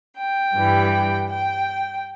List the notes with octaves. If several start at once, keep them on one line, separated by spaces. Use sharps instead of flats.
G5
G2 E3 G3
G5